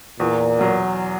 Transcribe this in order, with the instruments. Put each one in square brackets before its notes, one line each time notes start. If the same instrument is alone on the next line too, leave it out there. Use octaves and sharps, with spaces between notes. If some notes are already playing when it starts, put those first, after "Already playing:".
[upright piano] E2 [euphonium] A#2
[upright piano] B2 F#3